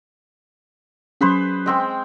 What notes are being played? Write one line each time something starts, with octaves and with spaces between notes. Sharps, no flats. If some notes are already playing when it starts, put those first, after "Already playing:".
F#3 C#4 G#4 B4 C5
G#3 C4 G5